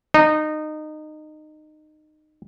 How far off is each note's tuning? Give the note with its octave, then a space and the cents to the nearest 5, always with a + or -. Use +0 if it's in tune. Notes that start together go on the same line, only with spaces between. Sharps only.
D#4 -20